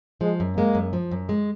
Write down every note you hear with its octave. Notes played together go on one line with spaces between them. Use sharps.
F3 G#3
F#2
G#3 A#3
F#2
F3
F#2
G#3